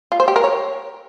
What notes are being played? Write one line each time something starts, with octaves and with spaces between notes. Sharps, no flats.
F4
C5
G4
A#4
C#5